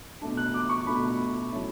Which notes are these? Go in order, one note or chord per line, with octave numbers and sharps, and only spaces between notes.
B2 A3 D4
F#6
D6
C#6
B2 A3 D4 B5
F#3 A3 C#4 E4